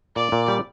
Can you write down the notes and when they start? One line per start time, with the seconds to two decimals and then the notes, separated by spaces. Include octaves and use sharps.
0.16 A#2 D5
0.32 A#2
0.48 G3